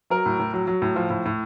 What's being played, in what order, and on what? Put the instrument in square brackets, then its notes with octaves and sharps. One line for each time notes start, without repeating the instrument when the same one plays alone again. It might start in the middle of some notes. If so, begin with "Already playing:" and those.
[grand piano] F#3 A#4
A2
A2
F#3
F#3
A2
F3
A2
A2